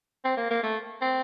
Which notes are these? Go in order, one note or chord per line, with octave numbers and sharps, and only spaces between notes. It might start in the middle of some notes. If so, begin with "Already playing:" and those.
C4
A#3
A#3
A3
C4